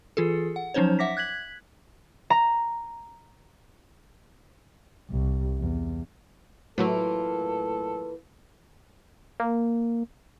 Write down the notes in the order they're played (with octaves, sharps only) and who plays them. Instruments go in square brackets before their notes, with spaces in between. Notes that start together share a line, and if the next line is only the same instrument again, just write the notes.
[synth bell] E3 F4 G#4 A4
F#5
F3 F#3 C#4 D#4 C5 C#5
E5 F#5 D6 A#6 B6
F#6 G#6 B6 F#7
[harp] A#5
[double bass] C2
E2
[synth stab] A2 F#3 A3 [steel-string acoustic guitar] E3 A#3 F4 [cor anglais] A4
[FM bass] A#3